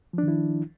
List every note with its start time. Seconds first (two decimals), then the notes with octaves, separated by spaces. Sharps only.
0.13 F3
0.18 D4
0.23 D#3
0.28 E4